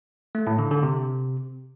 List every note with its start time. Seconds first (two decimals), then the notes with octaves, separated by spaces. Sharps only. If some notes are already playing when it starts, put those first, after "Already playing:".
0.35 A3
0.47 A2
0.59 D3
0.71 D3
0.83 C3